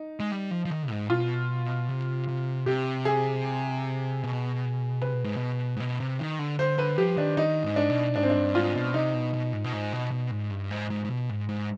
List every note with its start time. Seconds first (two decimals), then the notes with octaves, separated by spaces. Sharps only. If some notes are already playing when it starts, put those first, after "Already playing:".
Already playing: D#4
0.20 G#3
0.32 G3
0.51 F3
0.65 F3
0.71 D#3
0.90 G#2
1.09 B2 F4
1.89 C3
2.28 C3
2.66 C3 G4
3.05 G#4
4.23 B2
5.01 C3 B4
5.13 B2
5.24 G#2
5.36 B2
5.76 G#2
5.80 B2
6.00 C3
6.20 D#3
6.39 D3
6.59 D3 C5
6.78 D3 B4
6.98 F3 G4
7.17 D#3 D4
7.37 D#3 D#4
7.63 G#2
7.76 D4
7.90 B2
8.15 G#2 D4
8.23 C4
8.30 D4
8.36 G2
8.55 G#2 F4
8.75 B2
8.94 C3 D#4
9.14 B2
9.34 B2
9.53 G#2
9.64 B2
9.73 G#2
9.93 B2
10.11 B2
10.31 G#2
10.51 G2
10.71 G#2
10.90 G#2
11.05 G#2
11.10 B2
11.30 G#2
11.49 G#2